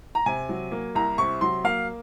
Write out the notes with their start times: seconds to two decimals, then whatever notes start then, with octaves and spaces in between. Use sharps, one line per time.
0.15 A#5
0.26 C3 G#5
0.49 F#3
0.72 A#3
0.95 C2 A#5
1.18 C3 C#6
1.41 F#3 C6
1.64 A#3 F5